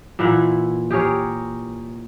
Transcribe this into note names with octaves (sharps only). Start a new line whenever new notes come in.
A#2 E3 E4 F#5
G4 G#4 A#4 C#5